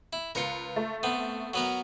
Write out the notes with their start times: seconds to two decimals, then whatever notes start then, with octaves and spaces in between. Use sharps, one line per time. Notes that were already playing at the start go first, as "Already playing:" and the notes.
0.13 E4
0.35 C#2 F4 A#4 B4 C#7
0.76 A3
1.03 B3 C4
1.54 F#3 B3 A#4